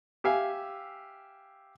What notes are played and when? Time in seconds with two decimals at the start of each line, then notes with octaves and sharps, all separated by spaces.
0.24 G4 E5 F5 G#5